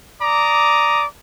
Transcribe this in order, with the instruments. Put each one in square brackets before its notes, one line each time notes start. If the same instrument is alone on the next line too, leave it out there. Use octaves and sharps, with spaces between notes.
[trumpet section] D5 A#5 D6 D#6